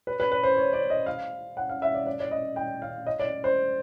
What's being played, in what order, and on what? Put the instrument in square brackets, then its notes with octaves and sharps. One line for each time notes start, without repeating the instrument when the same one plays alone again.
[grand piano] B4
B4
B4
C5
C#5
D5
D#5
F5
F#5
F5
E5
D5
D5
D5
D#5
G5
F5
D#5
D5
C5